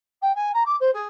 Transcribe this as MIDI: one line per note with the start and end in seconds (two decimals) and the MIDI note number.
0.21 0.34 79
0.35 0.51 80
0.53 0.63 82
0.65 0.75 86
0.80 0.90 72
0.93 1.07 68